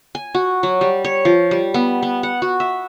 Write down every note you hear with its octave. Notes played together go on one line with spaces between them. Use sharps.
G#5
F#4
F#3
G3
C#5
F3
G3
B3
B3
F#5
F#4
E5